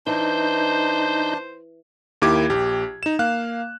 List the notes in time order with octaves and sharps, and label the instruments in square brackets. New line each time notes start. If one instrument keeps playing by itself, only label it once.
[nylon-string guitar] E3 [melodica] D4 [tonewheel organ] D#4 G6 [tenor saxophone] C5
[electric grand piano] D#2 A#3 E4 G4 D6 G#6
A#1 G4
D#4 E7
A#3 F5 F#6